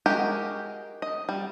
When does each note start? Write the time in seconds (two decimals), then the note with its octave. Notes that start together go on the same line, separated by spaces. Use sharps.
0.06 G#3 F#4 G4 A#4
1.02 D#5
1.29 G3